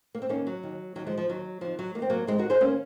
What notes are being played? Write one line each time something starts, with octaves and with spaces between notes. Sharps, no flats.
A#3
C4
D#2 D#3 A#3 C#4
F#3
D#2 D#3
D#2 D#3 F#3
F3 G#3
F3
D#2 D#3 F#3
F2 D#3 F3
F#3
F2 D#3 A#3 C4
F#3 A#3
F2 D#3 G#3 C4
F#4 A#4
G#4 C5
D#3 A#3 C#4